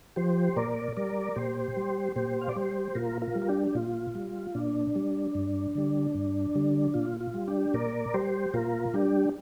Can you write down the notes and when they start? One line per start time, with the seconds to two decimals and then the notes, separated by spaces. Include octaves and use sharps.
0.16 F3 G4 C5
0.56 A#2 A#4 D5
0.96 G3 A#4 D5
1.36 A#2 G4 C5
1.77 G3
2.16 A#2 G4 C5
2.41 F5
2.49 D5
2.55 G3 G4 C5
2.95 A#2 F4 A#4
3.22 F4 A#4
3.35 G3
3.42 A#4
3.48 D4 G4
3.67 G4
3.75 A#2 F4
4.15 G3
4.55 A#2 D4
4.95 G3
5.35 G2
5.75 D3 G3
6.15 G2
6.55 D3 G3
6.94 A#2 F4
7.21 F4
7.34 G3
7.48 D4 G4
7.74 A#2 A#4 D5
8.14 G3 G4 C5
8.53 A#2 F4 A#4
8.94 G3 D4 G4